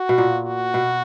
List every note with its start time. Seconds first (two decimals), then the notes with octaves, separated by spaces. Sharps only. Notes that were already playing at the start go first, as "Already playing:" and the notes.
Already playing: F#4
0.09 B2
0.18 A#2
0.46 F#4
0.74 B2